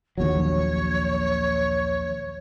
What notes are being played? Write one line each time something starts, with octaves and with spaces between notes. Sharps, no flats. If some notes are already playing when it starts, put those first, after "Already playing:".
A#1 D#2 F#3 C#5